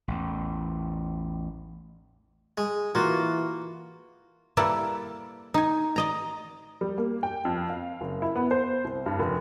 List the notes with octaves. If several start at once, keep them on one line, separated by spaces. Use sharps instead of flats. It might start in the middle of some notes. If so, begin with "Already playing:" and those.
A1 E2
G#3
E3 A#3 F4 F#4
G3 A#3 E4 A4 B4 D5
D#4 G#5
D5 D#5 A#5
G3
A#3
G5
F2
F5
F#1
E4
B3
C5
C2
G2
F1